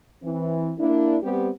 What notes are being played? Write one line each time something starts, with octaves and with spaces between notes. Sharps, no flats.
E3 C4
A#3 D4 E4
G3 B3 C4 G4